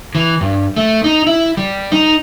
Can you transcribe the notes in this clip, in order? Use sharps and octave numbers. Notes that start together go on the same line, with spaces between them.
E3
G2
A3
D#4
E4
G3
D#4